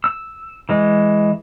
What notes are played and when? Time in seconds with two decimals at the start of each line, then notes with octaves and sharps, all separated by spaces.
0.04 E6
0.69 E3 G#3